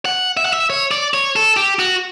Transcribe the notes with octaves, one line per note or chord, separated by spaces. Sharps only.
F#5
E5
F#5
E5
C#5
D5
C#5
A4
G4
F#4